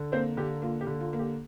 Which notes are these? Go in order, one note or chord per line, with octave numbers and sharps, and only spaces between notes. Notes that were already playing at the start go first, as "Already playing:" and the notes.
Already playing: D3
A#3 C4 C5
D3 G4
A#3 F4
G4
D3
F4
A#3
G4